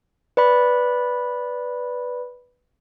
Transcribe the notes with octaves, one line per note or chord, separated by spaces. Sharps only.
B4 D5 B5